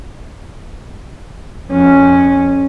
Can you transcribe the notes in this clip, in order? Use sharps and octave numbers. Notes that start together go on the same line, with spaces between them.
F2 C#4